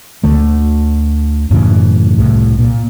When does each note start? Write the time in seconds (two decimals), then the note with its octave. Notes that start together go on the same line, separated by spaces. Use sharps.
0.24 D2 D3 A3
1.51 F#2 A2 C#3 E3
2.18 C2 A2
2.59 A#2